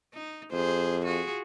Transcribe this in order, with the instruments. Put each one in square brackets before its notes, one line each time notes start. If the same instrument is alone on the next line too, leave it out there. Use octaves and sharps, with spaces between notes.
[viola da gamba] D#4
[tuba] F2 [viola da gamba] G#4 C5
[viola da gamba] F4 F#4 G#4